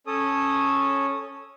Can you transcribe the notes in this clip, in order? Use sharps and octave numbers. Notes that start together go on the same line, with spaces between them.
C#4 A4 C#5 D#6